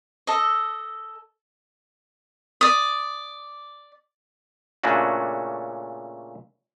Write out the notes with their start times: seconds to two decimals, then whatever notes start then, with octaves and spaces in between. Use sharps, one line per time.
0.27 A4 D#5
2.61 D5 D#6
4.84 A#2 C#3 A3 C#4 D4 F#4